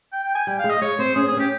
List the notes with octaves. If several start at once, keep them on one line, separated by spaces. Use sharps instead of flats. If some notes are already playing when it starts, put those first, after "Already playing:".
G5
G5
G#5
G3 G5
F5
G#3
D#5
G#3 C#5
C4 C5
C#4 G#4
C4 G#4
C#4 G4